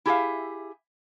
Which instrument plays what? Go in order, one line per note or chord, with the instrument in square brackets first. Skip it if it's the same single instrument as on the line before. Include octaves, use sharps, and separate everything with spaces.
[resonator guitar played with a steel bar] E4 G4 G#4 D5 E5 F5